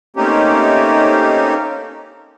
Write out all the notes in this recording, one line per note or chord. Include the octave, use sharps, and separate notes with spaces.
A3 A#3 C4 C#4 D#4 G4